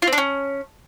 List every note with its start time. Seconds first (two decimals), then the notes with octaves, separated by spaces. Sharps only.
0.02 F4
0.07 C4
0.13 D4
0.18 C#4